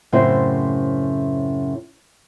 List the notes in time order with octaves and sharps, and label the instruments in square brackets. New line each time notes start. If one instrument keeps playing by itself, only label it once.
[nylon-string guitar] F#2 A2 C#3 C4 E4 C5